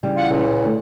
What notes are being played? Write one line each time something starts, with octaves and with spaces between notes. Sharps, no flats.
C#3 E3 G3
F4 F#5
C#2 A#2
E3
D3 A3